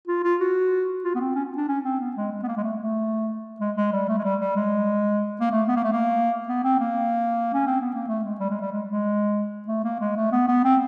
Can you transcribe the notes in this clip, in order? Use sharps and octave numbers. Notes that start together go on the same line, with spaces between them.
F4
F4
F#4
F4
B3
C4
C#4
D4
C#4
C4
B3
G#3
G#3
B3
A#3
G#3
A3
A3
G#3
G#3
G3
A3
G#3
G3
G3
G#3
A#3
A3
B3
A#3
A3
A#3
B3
C4
A#3
C#4
C4
B3
A#3
A3
G#3
G3
G#3
G3
G#3
G#3
A3
A#3
G#3
A3
B3
B3
C4